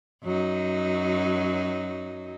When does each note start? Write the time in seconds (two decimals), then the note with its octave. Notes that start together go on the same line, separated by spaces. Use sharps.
0.23 F#2 F#3 D#4